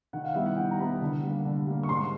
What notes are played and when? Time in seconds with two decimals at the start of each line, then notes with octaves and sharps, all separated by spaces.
0.13 D#3 F#5
0.25 F5
0.35 G3 B3 E4 E5
0.46 F#5
0.57 D#3 G5
0.71 A#5
0.79 G3 B3 E4 B5
1.01 D3
1.23 G3
1.28 A#3
1.45 D3
1.66 G3 A#3
1.83 C#6
1.89 G#2 C6